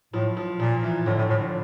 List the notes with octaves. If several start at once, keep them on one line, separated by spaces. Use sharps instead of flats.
A2 F3
F3
A#2 F3
E3
A2 D3
A2
A2 F3